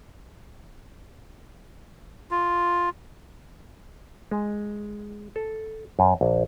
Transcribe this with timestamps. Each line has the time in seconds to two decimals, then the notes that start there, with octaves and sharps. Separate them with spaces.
2.31 F4
4.31 G#3
5.36 A4
5.99 F#2
6.21 A#1